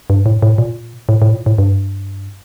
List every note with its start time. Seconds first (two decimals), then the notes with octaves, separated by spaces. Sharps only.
0.10 G2
0.26 A2
0.42 A2
0.58 A#2
1.09 A2
1.22 A2
1.33 A#2
1.46 A2
1.58 G2